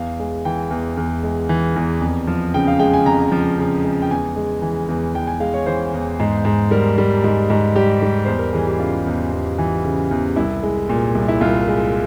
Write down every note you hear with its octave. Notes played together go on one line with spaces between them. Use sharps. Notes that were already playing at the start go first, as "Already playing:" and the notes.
Already playing: E2 F5
G#3
E3 G5
E2
E2
G#3
E3
E2
F2
F3
C#3 G5
F5
G#3 G5
G#5
F2 A#5
F3
C#3
G#3
G5
E2 G#5
G#3
E3
E2
E2 G5
G#5
G#3 F5
C#5
E3 C5
E2
G#2
G#2
G3 A#4
G3
G#2
G#2
G3 G4
G3
E2 C5
A#4
E3 G#4
G4
C#3 F4
E2
E2
E3
C#3
E2
C2 E4
G#3
A#2
C2
E4
C2 F4
G#3